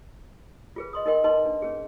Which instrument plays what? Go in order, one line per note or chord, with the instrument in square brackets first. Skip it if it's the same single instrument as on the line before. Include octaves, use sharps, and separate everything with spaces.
[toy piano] F4 G#4 B4
D#5 C6 D#6
D#4 A#4 D#5 G5 C6
D#4 B4 D#5 A5 C6
D4
C#4 G#4